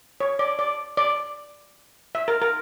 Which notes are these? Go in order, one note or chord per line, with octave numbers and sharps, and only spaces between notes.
C#5
D5
D5
D5
E5
A#4
A#4